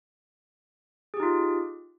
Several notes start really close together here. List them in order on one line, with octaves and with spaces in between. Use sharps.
G#4 G4 D#4 F4